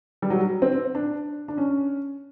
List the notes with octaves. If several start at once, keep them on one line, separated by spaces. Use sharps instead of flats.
G3
F#3
C4
D4
D4
C#4